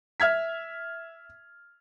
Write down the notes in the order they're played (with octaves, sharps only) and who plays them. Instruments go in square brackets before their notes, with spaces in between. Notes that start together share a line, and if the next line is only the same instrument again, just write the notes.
[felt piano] E5 F6 G#6 B6